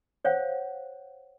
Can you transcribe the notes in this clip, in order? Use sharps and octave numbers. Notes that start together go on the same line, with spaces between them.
C5 C#5 F5 F#5